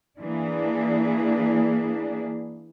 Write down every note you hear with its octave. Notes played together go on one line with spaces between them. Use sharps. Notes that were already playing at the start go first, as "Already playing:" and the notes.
E3 A#3 D4 G#4